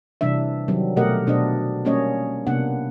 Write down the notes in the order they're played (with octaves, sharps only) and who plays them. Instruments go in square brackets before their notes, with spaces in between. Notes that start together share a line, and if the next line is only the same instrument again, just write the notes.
[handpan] C3 E3 G3 D4 E5
D#3 F#3 G3 C4
B2 A3 G4 A#4 D#5 F#5
B2 D4 C5 D#5
G3 A#3 C#4 C#5 D#5
C3 A#3 B3 D4 F#5